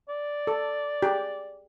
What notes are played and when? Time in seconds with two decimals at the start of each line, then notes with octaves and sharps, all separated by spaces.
0.09 D5
0.47 A4
1.02 G4 G#4